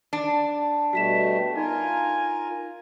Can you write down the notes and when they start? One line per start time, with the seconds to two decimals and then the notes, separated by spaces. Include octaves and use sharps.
0.13 D4
0.93 B2 G3 A3 F#4 B6 E7
1.56 D#4 F4 A#4 G#5